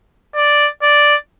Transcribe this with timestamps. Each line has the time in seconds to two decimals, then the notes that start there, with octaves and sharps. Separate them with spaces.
0.35 D5
0.82 D5